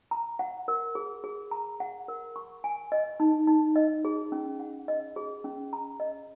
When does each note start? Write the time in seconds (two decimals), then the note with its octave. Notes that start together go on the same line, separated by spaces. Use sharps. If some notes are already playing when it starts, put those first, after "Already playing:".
0.11 A#5
0.39 F#5
0.68 A#4
0.95 G#4
1.24 G#4
1.51 A#5
1.80 F#5
2.08 A#4
2.36 C#6
2.64 G#5
2.92 D#5
3.20 D#4
3.48 D#4
3.76 D#5
4.05 G#4
4.32 C#4
4.60 F#5
4.88 D#5
5.16 G#4
5.44 C#4
5.73 A#5
6.00 D#5